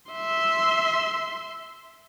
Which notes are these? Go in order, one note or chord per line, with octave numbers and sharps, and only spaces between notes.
E5 C6